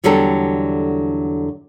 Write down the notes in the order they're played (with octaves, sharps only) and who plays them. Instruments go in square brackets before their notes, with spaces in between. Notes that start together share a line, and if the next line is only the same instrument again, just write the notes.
[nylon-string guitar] E2 D3 F#3 G3 A4